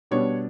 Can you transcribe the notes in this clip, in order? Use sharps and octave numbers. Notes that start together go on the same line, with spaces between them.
B2 G3 B3 D4 C#5